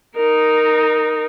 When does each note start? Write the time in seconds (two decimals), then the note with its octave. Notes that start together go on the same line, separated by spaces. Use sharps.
0.16 D#4 A#4